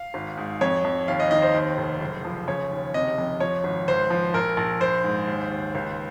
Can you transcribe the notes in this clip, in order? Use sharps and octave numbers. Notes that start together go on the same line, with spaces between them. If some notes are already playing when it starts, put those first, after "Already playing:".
Already playing: F5
G#1
G#2
F2 C#5
F2
D#2 F5
D#5
D#3 D#5
C5
D#2
F1
F#1
F3
C#3 C#5
D#2
C3 D#5
F2
F3 C#5
G#1
C#2 C5
F3
A#1 A#4
A#1
A#1 C5
G#2
D#2
D#2
C#2